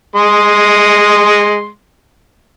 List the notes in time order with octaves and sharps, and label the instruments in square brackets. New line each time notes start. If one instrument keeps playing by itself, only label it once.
[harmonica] G#3 C6